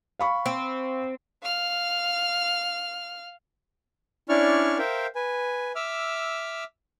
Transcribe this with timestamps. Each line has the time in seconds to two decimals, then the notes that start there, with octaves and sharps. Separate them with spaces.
0.19 F5 B5 C#6
0.46 C4
1.42 F5 F6
4.29 C#4 D4 E4 D5 C#6 F6
4.78 A#4 C5 E5 F5 G5
5.15 B4 G#5
5.75 E5 D6 E6 F6